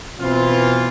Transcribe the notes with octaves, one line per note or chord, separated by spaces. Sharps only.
B2 E3 C4 F4